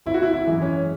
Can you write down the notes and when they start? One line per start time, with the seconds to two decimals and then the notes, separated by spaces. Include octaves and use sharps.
0.06 G#1 E4
0.14 F#4
0.22 E4
0.33 E4
0.47 F#2 E3 G#3
0.62 C#4